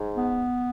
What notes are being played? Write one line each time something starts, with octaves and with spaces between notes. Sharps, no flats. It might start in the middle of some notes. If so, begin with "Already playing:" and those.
Already playing: G#2
B3